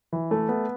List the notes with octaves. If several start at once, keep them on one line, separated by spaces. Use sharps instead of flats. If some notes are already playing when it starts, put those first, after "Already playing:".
E3
A3
B3